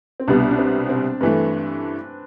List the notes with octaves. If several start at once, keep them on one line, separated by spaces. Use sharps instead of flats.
C4
C2 B2 G3 B3 D4
D4
C4
C4
G2 E3 A3 B4